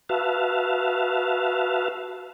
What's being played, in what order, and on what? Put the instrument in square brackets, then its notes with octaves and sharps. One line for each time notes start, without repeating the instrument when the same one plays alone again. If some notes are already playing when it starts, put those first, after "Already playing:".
[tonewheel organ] F#4 B4 E5 F5 A5